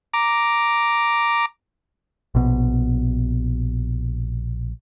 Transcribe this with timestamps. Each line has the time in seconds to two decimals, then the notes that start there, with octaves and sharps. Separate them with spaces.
0.14 A#5 D6
2.35 A#1 B2